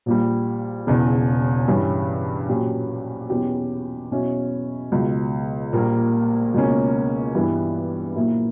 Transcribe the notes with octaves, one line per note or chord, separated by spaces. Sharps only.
A#1 A#2 G3
E1 E2 C#3
G2 E3 G3 C#4
A#1 A#2 F#3 C#4 G4
E2 B2 F#3 C#4 G4
E2 B2 F#3 C#4 E4
C#2 B2 F#3
A#1 A#2 G3 A#3
C#2 B2 A#3 C#4
G2 E3 G3 B3 E4
A#1 A#2 F#3 A#3 E4